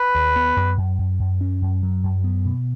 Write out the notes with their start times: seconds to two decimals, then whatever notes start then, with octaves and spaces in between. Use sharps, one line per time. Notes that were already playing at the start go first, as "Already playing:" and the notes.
Already playing: B4
0.15 D#2
0.36 B3
0.56 F#2
0.78 F#2
0.98 F#2
1.20 F#2
1.41 C#4
1.62 F#2
1.83 F#3
2.04 F#2
2.24 B3
2.45 B2